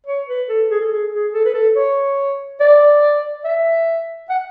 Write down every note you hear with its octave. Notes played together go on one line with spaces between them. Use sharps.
C#5
B4
A4
G#4
A4
G#4
G#4
A4
B4
A4
C#5
D5
E5
F#5